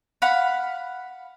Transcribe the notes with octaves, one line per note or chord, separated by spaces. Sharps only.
F5 F#5 B5